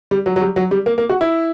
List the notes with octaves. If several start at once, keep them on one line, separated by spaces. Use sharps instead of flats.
G3
F#3
F#3
G3
F#3
G3
A#3
A#3
F#4
E4